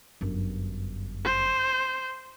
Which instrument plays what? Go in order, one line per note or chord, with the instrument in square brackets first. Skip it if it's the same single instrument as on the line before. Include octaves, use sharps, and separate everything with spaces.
[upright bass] G1 F#2
[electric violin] C5